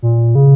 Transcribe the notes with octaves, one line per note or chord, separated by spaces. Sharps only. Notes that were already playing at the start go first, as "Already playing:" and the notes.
A#2
C#3